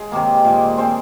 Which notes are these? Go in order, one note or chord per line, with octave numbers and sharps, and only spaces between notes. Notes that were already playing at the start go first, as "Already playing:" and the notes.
Already playing: G#3 G#4
C3 D#3 A#3
A#2 G#3
G#3 C4 C5